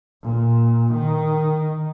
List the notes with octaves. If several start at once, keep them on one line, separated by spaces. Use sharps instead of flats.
A#2
D#3